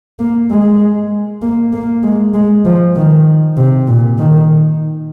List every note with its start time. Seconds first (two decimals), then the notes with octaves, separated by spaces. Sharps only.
0.19 A#3
0.50 G#3
1.42 A#3
1.73 A#3
2.03 G#3
2.34 G#3
2.65 F3
2.96 D#3
3.57 C3
3.87 A#2
4.18 D#3